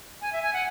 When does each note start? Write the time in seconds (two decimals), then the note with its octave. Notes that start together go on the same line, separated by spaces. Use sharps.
0.21 G#5
0.32 E5
0.42 G#5
0.53 F#5